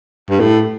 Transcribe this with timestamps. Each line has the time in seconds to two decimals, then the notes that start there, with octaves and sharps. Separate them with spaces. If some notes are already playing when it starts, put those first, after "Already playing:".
0.29 G2
0.40 A2